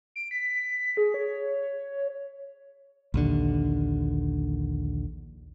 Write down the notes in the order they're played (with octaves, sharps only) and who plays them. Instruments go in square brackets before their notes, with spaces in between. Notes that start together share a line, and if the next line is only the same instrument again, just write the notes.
[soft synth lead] D7
B6
G#4
C#5
[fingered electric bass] A#1 D#2 D3